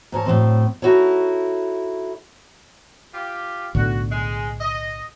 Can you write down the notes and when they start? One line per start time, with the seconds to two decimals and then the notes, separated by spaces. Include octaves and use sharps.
0.12 G#2 A#4 C#5 A5
0.26 A2 F#3 G#3 C4
0.82 D#4 E4 F#4 A4 C#5
3.14 F4 G4
3.75 B1 A2 D3 F#4
4.12 G#3
4.61 D#5